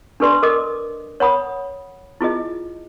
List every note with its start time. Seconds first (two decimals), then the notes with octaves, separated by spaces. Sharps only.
0.20 D4 G4 A4 B4 D5 C6
0.43 A4 A#4 D#5 D6 D#6
1.20 C#5 F#5 B5 D#6
2.21 E4 F4 G#4 D#5